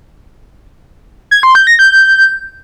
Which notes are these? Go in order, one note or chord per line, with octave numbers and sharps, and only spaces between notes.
G#6
C6
G6
A#6
G6